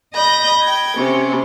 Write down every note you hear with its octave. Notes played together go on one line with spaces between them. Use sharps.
D#5 B5 G6 A#6
G5 G#6
C3 C#4